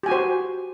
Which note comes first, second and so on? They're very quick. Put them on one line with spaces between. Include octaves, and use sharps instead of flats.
G4 G#5 F#4 C5